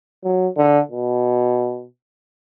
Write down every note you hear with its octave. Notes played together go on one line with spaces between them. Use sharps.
F#3
D3
B2